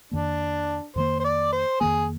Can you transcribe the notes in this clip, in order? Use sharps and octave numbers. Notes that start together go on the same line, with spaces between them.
F2 D#3 A#3 D4
F2 D#3 A#3 C5
C5
D5
C5
F2 D#3 A#3 G#4